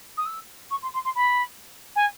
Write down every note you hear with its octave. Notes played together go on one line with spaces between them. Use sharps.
D#6
E6
C#6
C6
C6
C6
B5
G#5